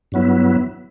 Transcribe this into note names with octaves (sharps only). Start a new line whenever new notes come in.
G2 F#3 B3 E4